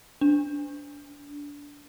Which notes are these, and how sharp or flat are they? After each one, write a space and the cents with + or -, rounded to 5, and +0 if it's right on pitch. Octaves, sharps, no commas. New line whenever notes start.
D4 -15